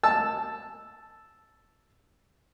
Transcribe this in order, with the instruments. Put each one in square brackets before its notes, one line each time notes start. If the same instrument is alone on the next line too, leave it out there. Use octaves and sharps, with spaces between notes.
[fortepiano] A5 E6